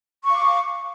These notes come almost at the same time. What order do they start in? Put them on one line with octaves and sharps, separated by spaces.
C#6 F5 D6